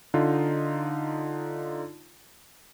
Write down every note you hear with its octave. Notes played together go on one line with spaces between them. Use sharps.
D3 D#4 F4